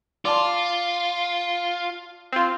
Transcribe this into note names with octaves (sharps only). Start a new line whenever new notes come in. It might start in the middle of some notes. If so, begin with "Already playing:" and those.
F4 D5 A5 C6
C4 F4